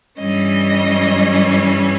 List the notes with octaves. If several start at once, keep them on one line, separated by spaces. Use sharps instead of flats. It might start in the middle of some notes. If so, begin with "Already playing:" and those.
G2 E3 G3 C#4 D#5